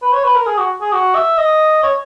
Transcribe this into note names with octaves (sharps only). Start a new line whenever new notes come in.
B4
C#5
B4
A#4
G#4
F#4
G#4
F#4
E5
D#5
C#5